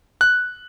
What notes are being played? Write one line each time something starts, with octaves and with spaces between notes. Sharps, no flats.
F#6